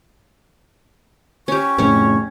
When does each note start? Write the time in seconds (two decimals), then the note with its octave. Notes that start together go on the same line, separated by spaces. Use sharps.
1.48 C#4 G4 C#6
1.78 F2 A2 C#3 C#4 C#5